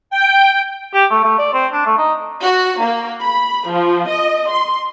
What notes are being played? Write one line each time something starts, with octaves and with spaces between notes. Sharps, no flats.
G5
G4
A3
A3
D5
C4
D4
A3
D#4
F#4
A#3
B5
F3
D#5
C6